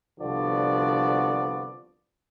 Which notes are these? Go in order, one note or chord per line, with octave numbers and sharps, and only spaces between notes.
C2 D3 F3 B3 F#4 D5